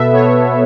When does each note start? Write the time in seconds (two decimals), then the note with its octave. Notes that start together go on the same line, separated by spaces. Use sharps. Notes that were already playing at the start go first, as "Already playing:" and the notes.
Already playing: B2 B3 A4 B4 E5
0.13 B3 C#5